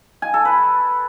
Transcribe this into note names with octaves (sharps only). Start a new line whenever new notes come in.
G#5
A4
B4